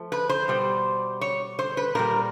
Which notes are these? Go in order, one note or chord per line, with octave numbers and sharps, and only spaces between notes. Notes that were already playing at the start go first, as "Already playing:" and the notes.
Already playing: F3 A3
B4
C5
B2 G3
C#5
C5
B4
A#2 G3 A#4